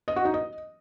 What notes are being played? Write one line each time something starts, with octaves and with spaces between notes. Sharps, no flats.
D#5
F#4
D#4
D#5